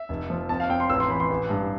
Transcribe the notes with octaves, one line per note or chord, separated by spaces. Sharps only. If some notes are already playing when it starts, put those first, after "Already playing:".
Already playing: E5
F1
F3
F2 A5
F5
F2 G5
C6
A1 E6
C6
E3 B5
C6
A1
G2